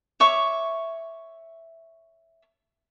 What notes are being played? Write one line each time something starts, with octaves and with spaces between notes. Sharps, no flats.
C#5 E5 C#6 D6